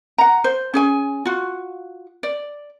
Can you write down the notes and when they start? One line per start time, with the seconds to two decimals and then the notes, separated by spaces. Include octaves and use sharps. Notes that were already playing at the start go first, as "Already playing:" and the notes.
0.18 F#5 A#5
0.44 C5
0.74 C#4 G#4 G#5
1.25 F4 F#4
2.23 D5